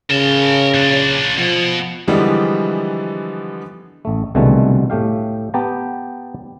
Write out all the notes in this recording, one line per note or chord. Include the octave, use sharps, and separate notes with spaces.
C#3 A#4 A5
A#2 D4
B2 F3
D3 E3 F3 G3 G#3 B3
A1 A3
C2 B2 D3 D#3 G#3 A3
A2 A3 G4 F5
B3 G4 G5 A5 A#5